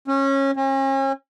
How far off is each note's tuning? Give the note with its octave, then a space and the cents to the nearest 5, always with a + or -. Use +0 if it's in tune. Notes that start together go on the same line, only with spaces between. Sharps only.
C#4 -20
C#4 -40